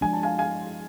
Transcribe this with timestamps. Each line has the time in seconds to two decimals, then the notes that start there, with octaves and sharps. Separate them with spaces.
0.01 F3 G#3 D4 G#5
0.13 A5
0.23 F5 G#5
0.38 F5 G#5